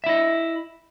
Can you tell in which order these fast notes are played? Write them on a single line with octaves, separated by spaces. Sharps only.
E5 E4 D#5